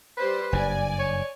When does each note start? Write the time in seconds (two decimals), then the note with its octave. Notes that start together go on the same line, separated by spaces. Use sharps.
0.17 G3 B4 C5
0.53 F#1 G2 D5 G#5
0.99 C#5